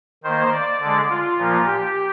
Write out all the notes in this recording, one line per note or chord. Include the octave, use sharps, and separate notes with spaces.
D#3 A#3 C5
D5
D3 G#3
F4
A#2 F3 A#3
G4